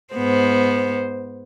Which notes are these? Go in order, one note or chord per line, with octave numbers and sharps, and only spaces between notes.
G#2 B3 C5